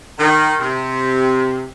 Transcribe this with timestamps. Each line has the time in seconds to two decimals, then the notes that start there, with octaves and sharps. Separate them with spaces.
0.18 D#3
0.59 C3